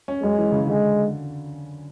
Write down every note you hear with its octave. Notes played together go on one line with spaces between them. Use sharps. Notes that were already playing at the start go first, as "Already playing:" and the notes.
C#4
F#2 G#3
E3
C#3
D3 G#3